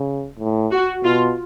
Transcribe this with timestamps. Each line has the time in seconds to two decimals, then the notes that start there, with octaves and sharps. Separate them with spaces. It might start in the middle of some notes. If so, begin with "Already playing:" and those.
Already playing: C#3
0.39 A2
0.71 F#4
1.04 B2 F4